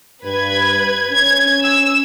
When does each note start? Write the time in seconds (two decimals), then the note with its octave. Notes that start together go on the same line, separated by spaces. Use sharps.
0.24 G2 B4 G#6
1.10 C#4 G#6
1.62 E6